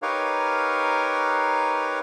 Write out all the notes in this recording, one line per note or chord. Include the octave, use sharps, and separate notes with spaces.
D#4 G4 A#4 B4 C#5 F5